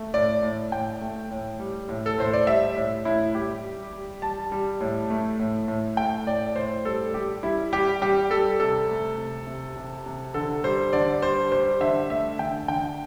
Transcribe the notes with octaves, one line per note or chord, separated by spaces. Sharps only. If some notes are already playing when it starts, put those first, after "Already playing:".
Already playing: A3
A2 D5
A2
A2 G5
A3
A2
G3
A2
A4
A2 C5
D5
G3 E5
A2
A2 E4
G3 G4
G3
G3
G3 A5
G3
A2
A3
A2
A2
A3 G5
A2 D5
A2 C5
G3 A4
G3 G4
G3 E4
G3 G4
G3 G4
G3 A4
C3 A4
A3
C3
C3
C3
C3
D3 A4
G3 C5
D3 D5
G3 C5
G3 C5
D3 E5
A3 E5
D3 G5
D3 G5